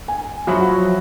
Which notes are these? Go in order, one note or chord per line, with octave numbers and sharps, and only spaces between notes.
G#5
F3 F#3 F#4 E5 B5